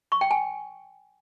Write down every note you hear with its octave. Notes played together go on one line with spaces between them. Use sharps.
C#6
G5
G#5